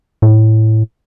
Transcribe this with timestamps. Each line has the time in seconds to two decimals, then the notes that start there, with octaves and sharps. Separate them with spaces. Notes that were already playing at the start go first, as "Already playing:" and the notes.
0.22 A2